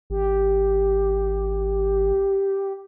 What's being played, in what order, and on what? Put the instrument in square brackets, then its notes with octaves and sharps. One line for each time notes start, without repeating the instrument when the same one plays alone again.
[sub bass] G#1 [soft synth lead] G4